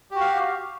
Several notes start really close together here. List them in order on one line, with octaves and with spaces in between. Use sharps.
G4 F#4 F5